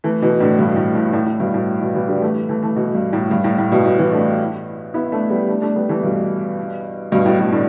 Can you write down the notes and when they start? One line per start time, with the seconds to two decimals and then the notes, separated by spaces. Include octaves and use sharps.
0.04 E3 A3
0.22 B2 E3
0.40 A2 D3
0.59 G2 B2
0.76 A2
0.95 A2
1.13 A2
1.26 A2
1.40 G2 B2
1.54 A2
1.81 B2 E3
1.95 B2 E3
2.08 D3 G3
2.22 E3 A3
2.49 E3 A3
2.63 E3 A3
2.76 B2 E3
2.95 G2
3.13 A2
3.31 G2
3.44 A2
3.58 A2
3.72 G2 B2
3.85 A2
3.99 B2 E3
4.12 A3 D4
4.94 B3 E4
5.12 A3 D4
5.30 G3 B3
5.49 A3 D4
5.62 A3 D4
5.76 G3 B3
5.89 E3 A3
6.03 G2 B2
7.12 G2 B2
7.26 A2
7.39 G2 B2
7.52 A2 D3